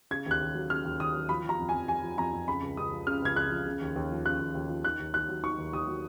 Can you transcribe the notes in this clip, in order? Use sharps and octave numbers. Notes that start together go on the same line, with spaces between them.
C#3 G#6
D#2 F#6
D#2
F#3
C#3 F6
D#2
D#2 D#6
F#3
F3 B5
F3 A#5
F2
G#5
F2
F3 G#5
F3
F2 A#5
F2
C#3 B5
C#2
C#2 D#6
F3
C#3 F6
C#2 G#6
C#2 F#6
F3
C#3
D#2
D#2
F3
C#3 F#6
D#2
D#2
F3
D#3 F#6
D#2
D#2 F#6
F#3
D#3 C#6
D#2
D#2 D#6
F#3